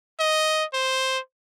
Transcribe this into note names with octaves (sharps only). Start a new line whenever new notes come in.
D#5
C5